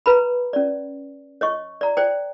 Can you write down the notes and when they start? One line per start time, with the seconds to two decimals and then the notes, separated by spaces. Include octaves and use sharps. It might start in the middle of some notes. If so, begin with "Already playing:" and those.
0.06 B4 A#5 B5
0.53 C#4 D5
1.41 C#5 D#5 C#6
1.81 D5 A#5
1.97 C5 D5 G5